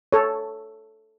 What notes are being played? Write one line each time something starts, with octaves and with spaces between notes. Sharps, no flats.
A4 C#5